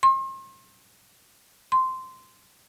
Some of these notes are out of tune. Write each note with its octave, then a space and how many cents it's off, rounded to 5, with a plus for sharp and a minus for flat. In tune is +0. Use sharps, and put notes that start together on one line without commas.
C6 +40
C6 -10